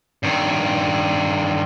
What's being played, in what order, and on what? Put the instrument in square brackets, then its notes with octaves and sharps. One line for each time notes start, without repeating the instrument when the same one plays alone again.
[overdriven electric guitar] G2 D#3